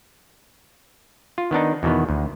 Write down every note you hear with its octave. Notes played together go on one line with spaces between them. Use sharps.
F4
D#3 B3 D4 D#4
E2 B2 D#3 B3
D2